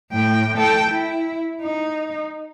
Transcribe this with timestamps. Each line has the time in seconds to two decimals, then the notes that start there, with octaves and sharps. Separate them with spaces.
0.12 A2 G5
0.58 A4 G5
0.90 E4
1.62 D#4